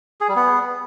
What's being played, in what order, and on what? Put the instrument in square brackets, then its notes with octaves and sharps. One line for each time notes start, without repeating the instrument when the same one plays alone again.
[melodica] G#4
G3
B3